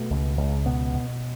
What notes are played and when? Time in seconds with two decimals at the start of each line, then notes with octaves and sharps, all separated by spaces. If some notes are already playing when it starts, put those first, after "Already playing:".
Already playing: B2 A3
0.10 C#2
0.37 C#2
0.66 B2 B3
0.94 B2